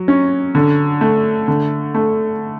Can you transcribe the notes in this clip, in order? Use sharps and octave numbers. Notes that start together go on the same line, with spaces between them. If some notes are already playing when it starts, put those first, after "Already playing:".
Already playing: F#3
C#4
D3
A3
D3
A3